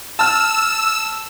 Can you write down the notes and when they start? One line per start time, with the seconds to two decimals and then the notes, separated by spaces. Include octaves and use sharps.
0.19 A5 E6 F6